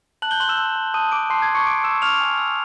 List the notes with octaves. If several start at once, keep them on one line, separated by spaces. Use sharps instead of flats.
A5 F#6 F#7
G6 G7
C6 F#6 F#7
E6 E7
A5
A5
A5 D#6 D#7
A5 D6 D7
A5 C6 C7
G#6
A5
C#6 C#7
C#6 D6 D7
C#6 E6 E7
C#6 F6 F7
G#5
E6